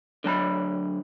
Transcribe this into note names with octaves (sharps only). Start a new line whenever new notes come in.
D3 F#3 A5 B5